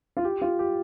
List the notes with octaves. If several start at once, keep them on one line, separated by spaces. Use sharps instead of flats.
F4
G4
F4
G4